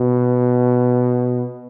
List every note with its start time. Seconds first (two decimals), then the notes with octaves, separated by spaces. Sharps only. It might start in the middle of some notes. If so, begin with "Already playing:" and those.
Already playing: B2